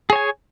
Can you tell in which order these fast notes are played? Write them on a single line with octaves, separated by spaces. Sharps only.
G#4 C#5 G#5